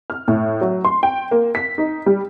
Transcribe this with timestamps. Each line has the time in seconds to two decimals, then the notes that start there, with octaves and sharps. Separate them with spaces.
0.10 F6
0.28 A2
0.61 F#3
0.85 C6
1.03 G5
1.31 A#3
1.55 B6
1.78 D#4
2.06 G3